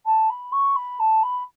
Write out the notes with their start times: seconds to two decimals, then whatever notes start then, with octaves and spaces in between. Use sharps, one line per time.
0.05 A5
0.30 B5
0.52 C#6
0.76 B5
0.99 A5
1.23 B5